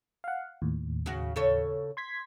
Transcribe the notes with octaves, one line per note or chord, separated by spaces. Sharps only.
F5 F#5
D#2 A2
C#3 F#4
C#3 A4 C#5
C6 G#6 B6